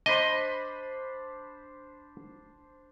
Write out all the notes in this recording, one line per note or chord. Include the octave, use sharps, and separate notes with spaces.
D4 C5 D#5 B5